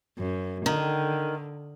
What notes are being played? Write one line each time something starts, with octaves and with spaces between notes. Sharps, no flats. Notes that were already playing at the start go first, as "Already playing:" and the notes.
F#2
D3 D#3